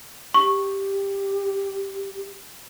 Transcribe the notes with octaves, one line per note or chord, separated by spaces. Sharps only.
G4 C#6